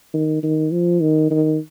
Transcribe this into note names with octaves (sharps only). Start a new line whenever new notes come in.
D#3
D#3
F3
D#3
D#3